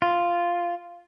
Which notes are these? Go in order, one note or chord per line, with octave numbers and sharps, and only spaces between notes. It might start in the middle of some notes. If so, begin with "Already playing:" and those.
F4